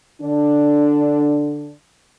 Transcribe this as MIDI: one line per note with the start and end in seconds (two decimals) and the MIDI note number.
0.21 1.72 50
0.21 1.72 62